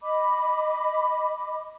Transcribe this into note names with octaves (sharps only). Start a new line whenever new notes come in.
D#5 B5 D6